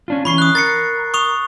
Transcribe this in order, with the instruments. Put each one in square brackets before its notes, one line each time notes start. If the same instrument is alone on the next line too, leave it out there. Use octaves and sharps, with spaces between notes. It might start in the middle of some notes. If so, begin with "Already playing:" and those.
[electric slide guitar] C#4 D4 F4
[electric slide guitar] E3 C#4 [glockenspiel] B5 C#6 C7
[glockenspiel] D#6 F#6
[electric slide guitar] A#4 [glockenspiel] A6 C7 C#7
[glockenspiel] C#6 D#6 F7